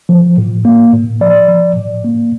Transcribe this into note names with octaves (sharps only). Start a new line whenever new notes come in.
F3
A2
A#3
A2
F3 D5
F3
A2
A#3